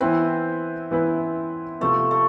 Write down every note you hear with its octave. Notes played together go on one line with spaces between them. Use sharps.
E3 B3 C4 E4 B4
E3 B3 E4 B4
C3 F3 A3 B3
A3